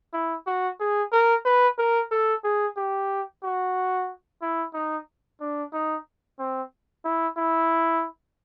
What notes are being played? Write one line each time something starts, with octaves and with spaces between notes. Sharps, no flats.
E4
F#4
G#4
A#4
B4
A#4
A4
G#4
G4
F#4
E4
D#4
D4
D#4
C4
E4
E4